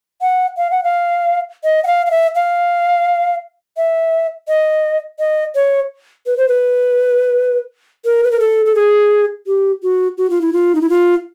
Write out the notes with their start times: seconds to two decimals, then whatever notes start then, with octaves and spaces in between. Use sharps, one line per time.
0.22 F#5
0.58 F5
0.71 F#5
0.84 F5
1.64 D#5
1.84 F#5
1.87 F5
2.06 F5
2.11 E5
2.35 F5
3.77 E5
4.48 D#5
5.19 D#5
5.55 C#5
6.27 B4
6.37 C5
6.48 B4
8.05 A#4
8.24 B4
8.32 A#4
8.39 A4
8.66 A4
8.75 G#4
9.47 G4
9.83 F#4
10.18 F#4
10.30 F4
10.41 E4
10.53 F4
10.75 D#4
10.81 E4
10.90 F4